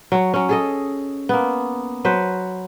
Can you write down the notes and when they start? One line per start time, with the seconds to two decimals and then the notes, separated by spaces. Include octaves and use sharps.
0.12 F#3 C#5
0.34 F#3 C#4
0.49 G#4 A4 D#5
1.29 A#3 B3
2.05 F#3 B4 C5